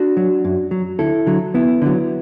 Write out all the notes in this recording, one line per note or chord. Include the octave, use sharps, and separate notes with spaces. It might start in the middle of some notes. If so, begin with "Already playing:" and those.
Already playing: D4 F#4
F#3
F#2
F#3
D2 E4 A4
D3 F#3
D2 B3 E4
D3 F#3